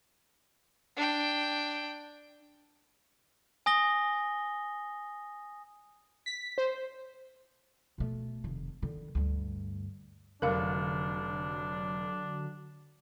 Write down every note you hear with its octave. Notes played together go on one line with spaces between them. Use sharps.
D4 G5
G#5 D#6 A#6 G7
B6
C5
B2 A3
F1 D#3
D3 D#3
D2 G2
F1 D3 F#3 D4 A#4 F5